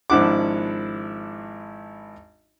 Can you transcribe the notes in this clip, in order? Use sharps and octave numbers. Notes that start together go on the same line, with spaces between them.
G#1 F3 D4 E4 F#5 D6